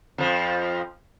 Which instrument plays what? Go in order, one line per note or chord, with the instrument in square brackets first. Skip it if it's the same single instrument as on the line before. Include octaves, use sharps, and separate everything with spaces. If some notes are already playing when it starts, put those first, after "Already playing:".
[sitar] F2 F3